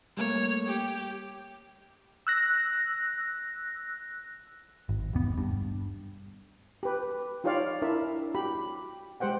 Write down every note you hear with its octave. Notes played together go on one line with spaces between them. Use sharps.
G3 A3 A#3 C#5
G4
E6 F#6 A#6
G#1
E1 D#2 B3
G2
G4 B4
D#4 F4 G4 C#5 D5 F5
D4 E4 A#4 E5
F#4 G4 B5
G#3 G4 C5 F#5 G5